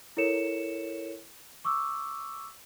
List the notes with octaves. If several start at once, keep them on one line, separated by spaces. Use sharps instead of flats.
E4 A4 A#4 C#5 C#7 E7
C#6 D6 E6